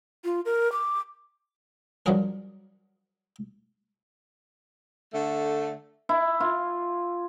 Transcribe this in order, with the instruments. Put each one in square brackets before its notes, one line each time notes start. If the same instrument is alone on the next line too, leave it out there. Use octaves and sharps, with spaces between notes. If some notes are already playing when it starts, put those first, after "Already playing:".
[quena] F4
A#4
D6
[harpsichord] G2 F3 F#3 F#4 G#4 A#4
[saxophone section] D3 A3
[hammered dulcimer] E4
F4